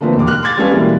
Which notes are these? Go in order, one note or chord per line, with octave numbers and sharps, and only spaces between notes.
D3 F3 A3 A#3 C4 B4
E1 D#2 D6
F6 F#6
C6 D6 G#6 A6
G3 G#3 C#4 A4 B4 F5
B2 E3 G3 G#3 A#3